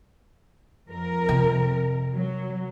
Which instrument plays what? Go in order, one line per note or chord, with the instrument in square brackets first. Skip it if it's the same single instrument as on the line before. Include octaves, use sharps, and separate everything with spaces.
[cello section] F2 A#4
[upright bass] C3
[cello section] F#3